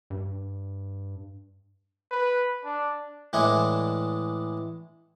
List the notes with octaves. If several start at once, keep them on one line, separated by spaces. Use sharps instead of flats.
G2
B4
D4
A2 E3 G#3 D4 E4